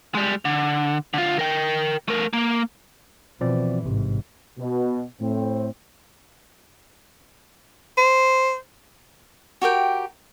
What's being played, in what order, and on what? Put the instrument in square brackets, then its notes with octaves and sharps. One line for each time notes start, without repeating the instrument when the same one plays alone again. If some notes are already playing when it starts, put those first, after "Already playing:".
[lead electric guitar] G3 G#3
D3
D3 F4
A#4 G5
A3 A#4
A#3
[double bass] B2 E3 [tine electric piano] F3 C4 D5
[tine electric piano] A1 C3 [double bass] G#2
[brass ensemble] B2
A2 C4
[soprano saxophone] C5
[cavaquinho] F#4 G4 A#4 G5